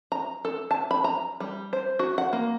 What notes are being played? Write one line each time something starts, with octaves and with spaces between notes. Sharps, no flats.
A#5
A4
A5
B5
A#5
G3
C5
F#4
F#5
A#3